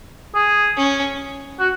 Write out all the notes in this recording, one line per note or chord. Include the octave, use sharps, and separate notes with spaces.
G#4
C#4
F#4